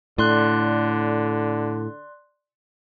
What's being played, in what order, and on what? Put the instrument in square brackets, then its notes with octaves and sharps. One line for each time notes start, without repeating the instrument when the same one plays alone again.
[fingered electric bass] A2 [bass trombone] D3 [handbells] D5 C6 F#6